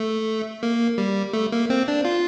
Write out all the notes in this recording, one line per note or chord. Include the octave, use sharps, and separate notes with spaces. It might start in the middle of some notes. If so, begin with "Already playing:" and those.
Already playing: A3
A#3
G3
A3
A#3
C4
D4
F4